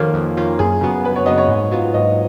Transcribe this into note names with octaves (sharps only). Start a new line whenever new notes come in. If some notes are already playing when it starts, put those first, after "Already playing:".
Already playing: F2 D#3 A#3 C#4 F4 F#4
F2
D#3 A#3 C#4 F4
F#2 G#4
C#3 F#3 B3
F#2 B4
C#5
C#3 F#3 B3 D#5
C#5
G#2
F#3 B3 F4
G#2 D#5